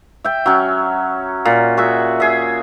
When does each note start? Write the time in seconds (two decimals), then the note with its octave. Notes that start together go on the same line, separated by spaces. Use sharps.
0.24 E5 G5
0.46 F#3 C#4
1.45 A#2
1.77 F#4 G#4 E5
2.20 G#4 E5